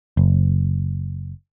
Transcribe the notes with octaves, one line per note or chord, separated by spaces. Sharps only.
F#1